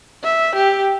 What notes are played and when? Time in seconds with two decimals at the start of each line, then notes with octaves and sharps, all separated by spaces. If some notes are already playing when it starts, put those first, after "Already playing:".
0.23 E5
0.55 G4